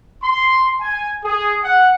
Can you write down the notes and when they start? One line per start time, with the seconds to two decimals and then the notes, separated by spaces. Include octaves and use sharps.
0.23 C6
0.81 G#5
1.24 G#4
1.63 F#5